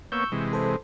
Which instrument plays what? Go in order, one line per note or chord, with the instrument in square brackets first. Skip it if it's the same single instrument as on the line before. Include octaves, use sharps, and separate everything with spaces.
[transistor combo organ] A#3 B3 C#5 [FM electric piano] C#6 E6 G6
[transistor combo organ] C3 E3 G#3
[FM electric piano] A4 C5